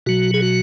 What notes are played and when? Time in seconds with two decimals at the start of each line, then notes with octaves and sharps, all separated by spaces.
0.06 B2 F#3 F#4
0.34 G#4
0.42 F#4